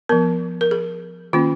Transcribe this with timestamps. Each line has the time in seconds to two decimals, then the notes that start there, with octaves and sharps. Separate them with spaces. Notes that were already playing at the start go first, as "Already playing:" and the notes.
0.09 F3 B3 A#4
0.61 A#4
0.71 G#4
1.33 D#3 A#3 C#4 F4